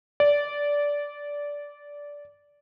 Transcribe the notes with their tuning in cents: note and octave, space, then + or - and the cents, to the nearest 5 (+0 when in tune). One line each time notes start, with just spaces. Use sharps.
D5 -15